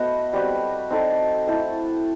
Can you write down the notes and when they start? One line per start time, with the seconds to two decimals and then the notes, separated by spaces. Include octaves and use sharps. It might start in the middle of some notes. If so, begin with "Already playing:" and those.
Already playing: A3 B3 F#4 C5 D#5
0.33 G3 C4 F#4 B4
0.90 C4 D#4 A4
1.47 A3 E4 A4 C5